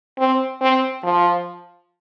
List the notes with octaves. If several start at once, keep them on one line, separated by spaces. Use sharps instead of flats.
C4
C4
F3